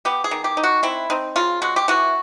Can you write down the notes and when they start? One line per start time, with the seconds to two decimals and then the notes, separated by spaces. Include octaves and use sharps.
0.05 B3 G4
0.24 G#4
0.31 D#3
0.44 G4
0.57 D#4
0.63 F#4
0.83 C4 E4
1.10 C4 D#4
1.36 C#3 F4
1.62 G#3 F#4
1.76 G4
1.88 E3 F#4